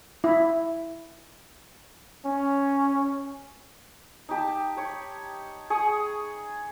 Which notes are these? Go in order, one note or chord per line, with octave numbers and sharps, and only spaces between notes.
E4
C#4
D#4 G4 A5
G4 C#5 B5
G#4 C#6 D#6